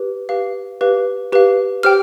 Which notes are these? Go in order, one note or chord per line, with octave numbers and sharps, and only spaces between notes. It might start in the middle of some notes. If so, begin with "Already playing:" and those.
Already playing: G4 B4
G4 B4 F5
G4 B4 F5
G4 B4 F5
G4 C5 G5 F6